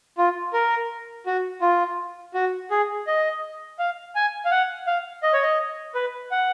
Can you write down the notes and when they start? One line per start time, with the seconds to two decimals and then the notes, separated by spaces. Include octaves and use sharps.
0.18 F4
0.53 A#4
1.26 F#4
1.61 F4
2.34 F#4
2.71 G#4
3.07 D#5
3.79 F5
4.15 G#5
4.45 F5
4.51 F#5
4.87 F5
5.23 D#5
5.33 C#5
5.42 D#5
5.95 B4
6.31 F#5